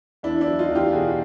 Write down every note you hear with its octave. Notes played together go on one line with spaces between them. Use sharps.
E2 D4 E4
D4 E4
F#3
D#4 F4
E2
F4 G4
B2 F#4 G#4